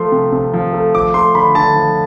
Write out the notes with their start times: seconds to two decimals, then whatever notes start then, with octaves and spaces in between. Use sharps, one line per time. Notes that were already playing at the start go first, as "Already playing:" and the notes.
Already playing: F3 A3 C6
0.12 C3
0.32 C3
0.54 F3
0.74 A3
0.94 F3 D6
1.14 A3 C6
1.35 D3 B5
1.55 D3 A5
1.76 F3